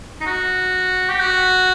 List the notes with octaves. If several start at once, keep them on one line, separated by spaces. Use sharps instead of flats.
D#4
F#4
G4
F#4